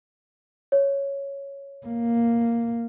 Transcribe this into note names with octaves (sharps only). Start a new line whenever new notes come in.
C#5
A#3